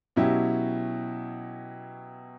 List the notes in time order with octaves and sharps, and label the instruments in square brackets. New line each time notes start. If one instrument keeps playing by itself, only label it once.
[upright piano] B2 F#3 C#4 E4 G4